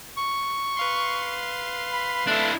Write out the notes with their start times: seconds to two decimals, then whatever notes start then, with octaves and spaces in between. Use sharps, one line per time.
0.17 C#6
0.77 B4 F5 C6
1.92 B5
2.27 A3 D4 E4